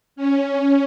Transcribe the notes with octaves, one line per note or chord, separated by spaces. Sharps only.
C#4